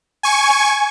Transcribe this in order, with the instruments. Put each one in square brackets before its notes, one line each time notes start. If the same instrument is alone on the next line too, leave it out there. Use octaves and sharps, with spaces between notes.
[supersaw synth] G#5 C#6